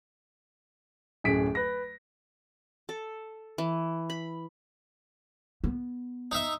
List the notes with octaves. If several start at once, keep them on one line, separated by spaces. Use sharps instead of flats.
D1 F#2 G#4 B6 D7
B4 A#6
A4
E3
B5
B3
D#4 E5